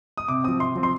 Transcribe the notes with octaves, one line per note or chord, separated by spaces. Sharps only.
D#6
C3 D6
F3 C4 D#6
C3 C6
F3 C4
C6